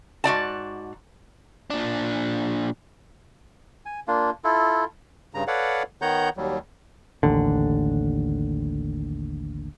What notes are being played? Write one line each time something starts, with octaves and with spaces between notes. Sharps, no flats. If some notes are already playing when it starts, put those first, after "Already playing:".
G#2 F#4 D5 A5
A#2 D4
G#5
A#3 D4 F4
E4 F4 A4
G2 C#3 A#5
A4 B4 C#5 D5 F5 F#5
D#3 B3 C#5 F#5 A#5 G6
D#2 F#3 G3
A1 D#2 D3